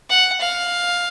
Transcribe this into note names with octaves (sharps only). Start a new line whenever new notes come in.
F#5
F5